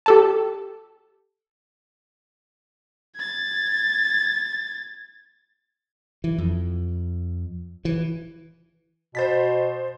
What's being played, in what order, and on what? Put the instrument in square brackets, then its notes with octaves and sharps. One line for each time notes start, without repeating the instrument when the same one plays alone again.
[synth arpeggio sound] G4 A4 A5
[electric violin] G#6 A6
[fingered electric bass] E3
F2
E3
[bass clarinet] B2 [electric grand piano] C5 A6 B6